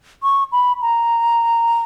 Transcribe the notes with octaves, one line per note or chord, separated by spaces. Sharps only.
C#6
B5
A#5